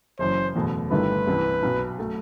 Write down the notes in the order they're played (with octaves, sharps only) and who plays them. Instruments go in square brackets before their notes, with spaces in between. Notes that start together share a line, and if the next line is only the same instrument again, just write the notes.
[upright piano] F#1 F#2 E3 [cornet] C5
[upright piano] F#1 E2 B2 A3
[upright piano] G1 G2 D#3 A3 E4 [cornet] B4
[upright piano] C2 C3 E3
B1 B2 F#3
F#3 A3